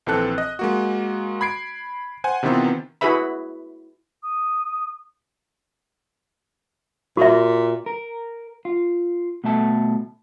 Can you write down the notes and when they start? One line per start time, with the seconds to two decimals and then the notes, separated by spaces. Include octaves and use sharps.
0.06 A#1 E3 C4 A4 F#6
0.38 D#5
0.59 G#3 A#3 F#4
1.41 B5 G#6 C7 D7
2.24 C5 F#5 G#5
2.43 C3 D#3 E3 B3 C4 F4
3.01 E4 F#4 G#4 B4 E5 B5
4.22 D#6
7.17 A#2 F#4 E5
7.86 A#4
8.65 F4
9.44 B2 A3 E5 A5